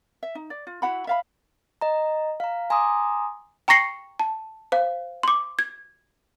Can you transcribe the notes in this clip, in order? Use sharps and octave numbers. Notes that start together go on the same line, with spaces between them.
E5
D#4
D5
F4
E4 F#4 F#5 B5
E5 F5 B5
D#5 A#5
F5 A#5
G#5 A#5 C6 D6 D#6
G5 A#5 C#6 A#6 C7 C#7
A5
C5 F5
C6 D6
G#6